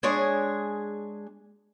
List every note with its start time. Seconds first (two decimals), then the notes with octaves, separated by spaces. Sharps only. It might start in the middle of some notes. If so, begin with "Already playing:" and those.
0.03 G#3 D4 G#4 C#5